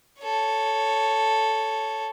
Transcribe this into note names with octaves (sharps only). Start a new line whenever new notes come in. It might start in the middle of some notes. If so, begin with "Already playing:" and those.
A4 C#5